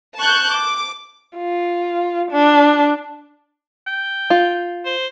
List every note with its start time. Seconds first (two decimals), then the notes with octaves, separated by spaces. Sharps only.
0.17 A5 C#6 F#6 G6
0.52 D6
1.37 F4
2.31 D4
3.87 G5
4.30 F4
4.86 C5